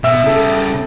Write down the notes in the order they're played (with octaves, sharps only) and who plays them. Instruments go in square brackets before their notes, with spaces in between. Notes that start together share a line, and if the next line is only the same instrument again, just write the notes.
[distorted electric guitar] B2 [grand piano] E5 E6
[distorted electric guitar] C#3 G3 [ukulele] E4 A4